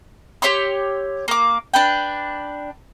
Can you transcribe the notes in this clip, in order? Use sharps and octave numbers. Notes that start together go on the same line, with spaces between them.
G4 C#5 C6 E6
A#3 D6
D4 B4 G5